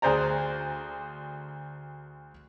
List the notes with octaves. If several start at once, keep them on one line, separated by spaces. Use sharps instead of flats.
D2 G#4 C5 D5 A#5